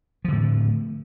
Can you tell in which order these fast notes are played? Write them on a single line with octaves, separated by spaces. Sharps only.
F3 D3 A2